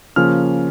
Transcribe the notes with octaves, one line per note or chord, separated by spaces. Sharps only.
C#3 F3 A#3 C#4 F6